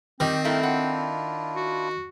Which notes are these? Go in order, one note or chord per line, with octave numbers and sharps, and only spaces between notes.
D#3 G3 C4 G4
G2 A3 E4 A#4 F5
D4 E4 F4 F#5
F#4